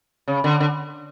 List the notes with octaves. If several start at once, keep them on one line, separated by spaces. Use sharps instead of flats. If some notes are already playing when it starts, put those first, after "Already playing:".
C#3
D3
D3